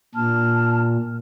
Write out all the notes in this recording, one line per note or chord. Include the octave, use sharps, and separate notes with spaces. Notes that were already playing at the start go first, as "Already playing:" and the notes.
A#2 D4 A5 F6